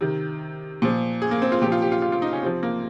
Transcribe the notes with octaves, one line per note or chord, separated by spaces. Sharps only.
C3 D#3
A#2 F3
G#4
A#3
C4
F4
A#2 F3 G4
F4
G4
F4
F4
F4
D#4
C#4
C3 F3 C4
A#3